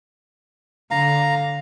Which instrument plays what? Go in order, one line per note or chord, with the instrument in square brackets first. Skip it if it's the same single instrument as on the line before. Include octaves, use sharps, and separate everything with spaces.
[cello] D3 [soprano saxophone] F5 [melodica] A#5